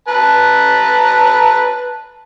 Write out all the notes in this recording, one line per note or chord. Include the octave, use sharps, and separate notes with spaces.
B4 A5 A#5